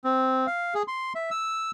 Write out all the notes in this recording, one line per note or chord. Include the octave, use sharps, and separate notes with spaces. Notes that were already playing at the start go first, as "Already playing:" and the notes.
C4
F5
G#4
C6
E5
E6